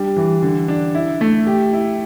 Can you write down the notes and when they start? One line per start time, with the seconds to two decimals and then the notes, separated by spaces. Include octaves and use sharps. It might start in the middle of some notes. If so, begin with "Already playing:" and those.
Already playing: G3 D4
0.17 E3
0.42 D3
0.68 D4
0.95 E4
1.21 A3
1.47 G4
1.73 E4